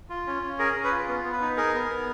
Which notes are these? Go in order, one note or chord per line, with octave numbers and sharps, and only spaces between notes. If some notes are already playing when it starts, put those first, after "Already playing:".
F4
C#4
C#4
G#4 A#4
C#4
B4
F4
B3
B3
B4
D#4
G#4 A#4
B3
B3